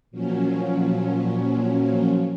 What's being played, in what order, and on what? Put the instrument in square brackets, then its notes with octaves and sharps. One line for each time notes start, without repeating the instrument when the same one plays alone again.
[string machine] A#2 F3 F#3 C#4